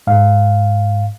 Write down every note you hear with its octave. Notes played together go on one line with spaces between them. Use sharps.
G#2 F5